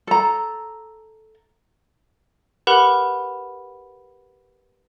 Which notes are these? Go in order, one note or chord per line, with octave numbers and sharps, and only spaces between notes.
A4 A#5
G4 A#4 B4 F#5 B5